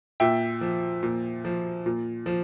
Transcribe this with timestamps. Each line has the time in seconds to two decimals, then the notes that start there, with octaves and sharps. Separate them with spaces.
0.20 A#2 E5 G5
0.61 F3
1.03 A#2
1.45 F3
1.86 A#2
2.26 F3